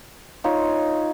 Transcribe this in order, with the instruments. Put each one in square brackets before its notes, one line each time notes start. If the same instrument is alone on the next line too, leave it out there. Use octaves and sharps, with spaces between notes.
[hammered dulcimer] D#4 F4 C#5